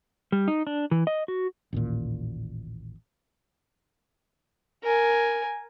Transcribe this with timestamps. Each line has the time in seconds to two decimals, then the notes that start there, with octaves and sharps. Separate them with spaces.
0.32 G3
0.48 D#4
0.67 D4
0.91 E3
1.07 D#5
1.28 F#4
1.73 A1 D#2 A#2
4.83 A#4 G#5